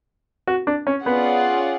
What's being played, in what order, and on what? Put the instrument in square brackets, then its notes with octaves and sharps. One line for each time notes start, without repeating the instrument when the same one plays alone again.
[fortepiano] F#4
D4
C#4
[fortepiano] B3 [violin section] C#4 F4 G#4 D5 F#5